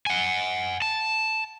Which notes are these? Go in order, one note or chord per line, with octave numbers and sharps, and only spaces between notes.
F#5 G#5
A5